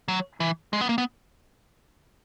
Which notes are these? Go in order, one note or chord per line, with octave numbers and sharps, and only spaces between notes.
F#3
E3
G#3
B3
A#3
B3